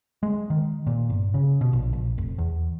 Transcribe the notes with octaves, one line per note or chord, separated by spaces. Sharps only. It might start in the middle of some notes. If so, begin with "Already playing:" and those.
G#3
D#3
A#2
G1
C#3
B2
A#1
A#1
F1
E2